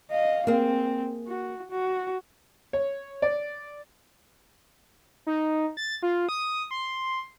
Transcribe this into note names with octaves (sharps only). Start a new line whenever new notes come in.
D#5 F5
A#3 C4 G#4
F#4
F#4
C#5
D5
D#4
A6
F4
D#6
C6